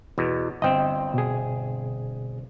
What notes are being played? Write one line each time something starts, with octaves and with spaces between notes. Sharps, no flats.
E2 B2
G1 C4 D#5 G5
B2 G#4